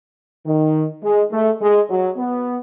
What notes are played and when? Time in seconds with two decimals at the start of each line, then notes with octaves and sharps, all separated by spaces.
0.46 D#3
1.03 G#3
1.31 A3
1.61 G#3
1.89 F#3
2.17 B3